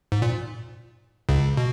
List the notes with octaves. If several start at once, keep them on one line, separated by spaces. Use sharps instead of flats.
G#2
A#2
C#2 C#3
B2